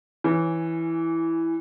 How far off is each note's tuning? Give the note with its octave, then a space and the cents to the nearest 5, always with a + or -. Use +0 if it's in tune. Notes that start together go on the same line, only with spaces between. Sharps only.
E3 +0 C#4 +0